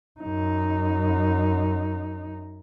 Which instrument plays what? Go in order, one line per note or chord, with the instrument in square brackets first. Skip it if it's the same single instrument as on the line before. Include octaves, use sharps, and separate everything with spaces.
[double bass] F#2 D#4